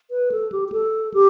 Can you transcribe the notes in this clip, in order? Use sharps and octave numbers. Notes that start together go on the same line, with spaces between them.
B4
A4
G4
G4
A4
G4